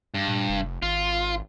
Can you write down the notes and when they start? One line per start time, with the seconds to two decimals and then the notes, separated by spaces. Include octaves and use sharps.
0.14 G2
0.28 A#2
0.49 F1
0.82 G#1 F4